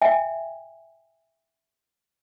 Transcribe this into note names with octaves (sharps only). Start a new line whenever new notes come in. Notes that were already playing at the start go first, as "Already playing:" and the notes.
E5 G5 G#5